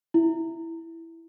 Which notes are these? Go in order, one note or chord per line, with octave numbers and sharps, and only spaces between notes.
E4